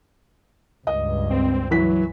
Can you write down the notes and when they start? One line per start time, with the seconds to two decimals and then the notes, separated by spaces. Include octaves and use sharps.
0.87 C#2 G2 D#5
1.30 C4
1.71 E3 F#3 B6